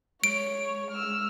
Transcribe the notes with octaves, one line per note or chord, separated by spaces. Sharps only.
G#3 C#5 D7
E6 F6